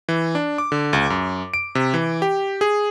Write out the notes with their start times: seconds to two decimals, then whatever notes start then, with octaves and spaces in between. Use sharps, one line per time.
0.09 E3
0.35 D4
0.58 D6
0.72 D3
0.93 C#2
1.10 F#2
1.54 D7
1.75 C3
1.94 E3
2.22 G4
2.61 G#4